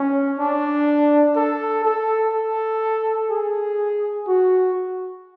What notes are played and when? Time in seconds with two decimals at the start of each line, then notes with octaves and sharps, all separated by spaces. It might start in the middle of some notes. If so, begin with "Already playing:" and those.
Already playing: C#4
0.39 D4
1.36 A4
1.85 A4
2.34 A4
3.31 G#4
4.28 F#4